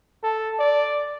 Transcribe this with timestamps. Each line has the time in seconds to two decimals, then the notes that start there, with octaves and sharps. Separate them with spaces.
0.23 A4
0.59 D5